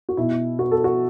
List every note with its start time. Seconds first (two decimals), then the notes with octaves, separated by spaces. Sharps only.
0.09 F#4
0.17 B2 E4
0.59 B3 F#4
0.72 A4
0.84 F#4